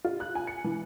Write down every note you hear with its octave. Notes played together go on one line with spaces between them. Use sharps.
F4
F#6
G#5
C#7
E3